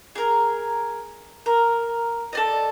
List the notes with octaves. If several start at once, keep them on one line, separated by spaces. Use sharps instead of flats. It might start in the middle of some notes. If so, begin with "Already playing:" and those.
G#4 A#4
A#4
A4 D5 D#5